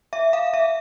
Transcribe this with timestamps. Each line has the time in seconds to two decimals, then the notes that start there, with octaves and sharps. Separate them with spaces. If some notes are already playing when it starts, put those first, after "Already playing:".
0.13 E5
0.33 F5
0.54 E5